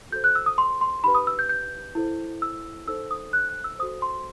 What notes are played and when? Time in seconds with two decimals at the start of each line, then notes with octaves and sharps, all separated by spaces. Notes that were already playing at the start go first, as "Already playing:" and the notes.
0.12 F#4 A4 C5 G6
0.24 F#6
0.35 E6
0.46 D#6
0.58 C6
0.81 C6
1.04 D#4 G4 B4 B5
1.15 D#6
1.27 E6
1.39 G6
1.49 G6
1.95 E4 A4 C5
2.42 E6
2.87 D#4 A4 C5 E6
3.11 D#6
3.33 F#6
3.49 F#6
3.64 E6
3.79 F#4 A4 C5 D#6
4.02 C6